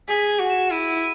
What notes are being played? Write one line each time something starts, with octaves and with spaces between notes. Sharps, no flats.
G#4 B6
F#4
E7
E4 D#7